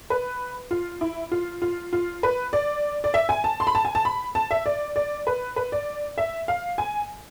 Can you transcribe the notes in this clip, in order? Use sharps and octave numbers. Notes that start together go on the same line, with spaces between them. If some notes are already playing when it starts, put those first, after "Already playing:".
B4
F4
E4
F4
F4
F4
B4
D5
D5
E5
G#5
A5
C6
B5
A5
G#5
A5
B5
A5
E5
D5
D5
B4
B4
D5
E5
F5
G#5